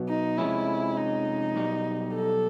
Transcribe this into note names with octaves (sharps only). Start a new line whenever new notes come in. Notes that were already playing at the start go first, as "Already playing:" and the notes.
Already playing: B2 F#3 B3
D#4
F2 C3 F3 G#3 C#4 E4
D#4
B1 B2 G3
A4